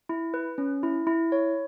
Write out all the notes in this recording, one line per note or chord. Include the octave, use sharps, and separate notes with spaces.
E4
B4
C#4
E4
E4
C#5